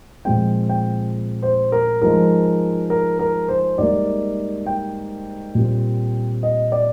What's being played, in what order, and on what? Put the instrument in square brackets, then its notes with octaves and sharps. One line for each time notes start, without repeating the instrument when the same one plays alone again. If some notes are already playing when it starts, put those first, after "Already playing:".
[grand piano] A#2 F3 G#3 C4 G5
G5
C5
A#4
G#2 F3 G#3 A#4
A#4
A#4
C5
G#2 G3 A#3 D5
G5
A#2 G3 C4
D#5
D5